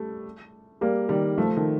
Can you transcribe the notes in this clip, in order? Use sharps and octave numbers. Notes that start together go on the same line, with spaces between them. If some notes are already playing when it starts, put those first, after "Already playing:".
Already playing: G3 A3
G3 A#3
D#3 G3
F3 A3
D#3